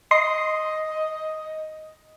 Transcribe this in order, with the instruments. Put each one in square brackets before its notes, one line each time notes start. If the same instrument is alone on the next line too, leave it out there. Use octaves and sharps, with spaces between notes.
[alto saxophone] D#5 [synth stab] C6